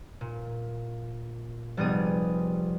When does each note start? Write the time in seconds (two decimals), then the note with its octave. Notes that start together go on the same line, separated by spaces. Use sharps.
0.21 A#2
1.77 F1 G3 B3 G#4 D#6